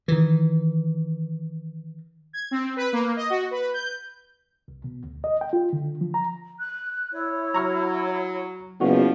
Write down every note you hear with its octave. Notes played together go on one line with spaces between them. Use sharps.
D#3 E3
G#6
C4
B4
A#3
D#5
F#4
B4
G6
C2
B2
D2
D#5
G5
F4
D3
F3
A#5
F#6
E4 C#5
F#3 A#5 C#6 F6
F#1 B2 F3 G3 B3 F#4 B4